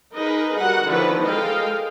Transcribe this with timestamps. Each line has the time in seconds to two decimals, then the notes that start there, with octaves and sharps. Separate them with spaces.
0.13 D#4 G#4 A#4 B4 D#5
0.57 G3 F#4 A#4 F#5
0.86 D#3 F3 C#4 E4 B4 D5
1.24 G#3 A4 A#4 D#5 F5 G5